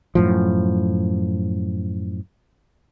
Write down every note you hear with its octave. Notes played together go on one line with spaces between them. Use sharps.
F#2 A2 F3